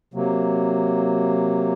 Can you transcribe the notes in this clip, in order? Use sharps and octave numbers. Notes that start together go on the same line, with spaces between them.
C3 F#3 A#3